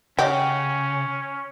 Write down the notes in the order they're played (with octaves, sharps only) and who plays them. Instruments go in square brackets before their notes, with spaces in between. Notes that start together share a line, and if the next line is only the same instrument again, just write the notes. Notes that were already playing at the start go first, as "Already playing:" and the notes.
[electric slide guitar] C#3 [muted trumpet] C#4 [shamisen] G4 [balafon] C#5 D#5 F#5